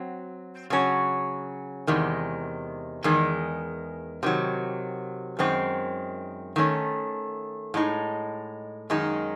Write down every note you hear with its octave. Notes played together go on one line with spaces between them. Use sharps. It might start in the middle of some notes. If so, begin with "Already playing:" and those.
Already playing: F#3 C4
C#3 F#3 C#4
E2 C3 D#3 G#3
E2 D#3 G#3
C3 D#3 F#3
F#2 D#3 G#3 C4
D#3 A3 C#4
A2 G#3 D#4
F#2 D#3 G#3 D#4